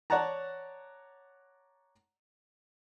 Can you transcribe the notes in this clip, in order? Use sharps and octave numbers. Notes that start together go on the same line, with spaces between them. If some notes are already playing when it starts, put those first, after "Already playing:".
C#5 D5 F#5 A5 A#5